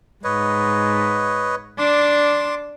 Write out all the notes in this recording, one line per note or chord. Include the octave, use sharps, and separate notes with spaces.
G#2 B4 C#5 D#5
D4 C6 D6